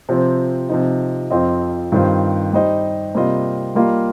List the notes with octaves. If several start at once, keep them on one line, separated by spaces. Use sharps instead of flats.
C3 F3 C4
C3 F3 D#4
F2 F3 C4 F4 D#5
G2 D#3 C4 F4 C5
G3 D#4 C5 D#5
C3 G3 A#3 F4 D#5
G3 A#3 F4 D#5